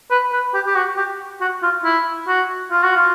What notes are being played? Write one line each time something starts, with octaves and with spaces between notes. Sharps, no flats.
B4
B4
G4
G4
F#4
G4
F#4
F4
E4
F#4
F4
F#4
F4